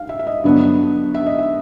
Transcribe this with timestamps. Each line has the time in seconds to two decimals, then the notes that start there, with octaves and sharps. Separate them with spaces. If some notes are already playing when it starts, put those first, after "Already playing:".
Already playing: F5
0.09 E5
0.19 E5
0.27 D#5
0.44 G2 D3 F#3 B3 D4
1.14 E5
1.27 D#5
1.38 E5